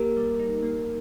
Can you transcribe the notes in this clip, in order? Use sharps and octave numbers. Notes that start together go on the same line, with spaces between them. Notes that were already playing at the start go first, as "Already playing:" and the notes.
Already playing: A#3 G4 A#4
G3
D#4
A#3